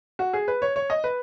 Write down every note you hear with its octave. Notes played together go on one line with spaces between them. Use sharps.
F#4
G#4
B4
C#5
C#5
D#5
B4